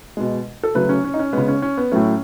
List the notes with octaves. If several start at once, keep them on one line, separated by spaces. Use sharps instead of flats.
B2 G#3
A4
C#3 F#3 A3 B4
C#4
C#4
D#4
C#4
C#3 G#3 B3
C#4
C#4
B3
A2 F#3 A3 C#4